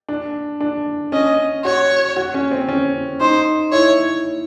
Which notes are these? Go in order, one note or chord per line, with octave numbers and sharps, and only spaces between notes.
D4
D4
C#4 D#5
F#4 C#5
F#4
C#4
C4
C#4
D#4 C5
E4 C#5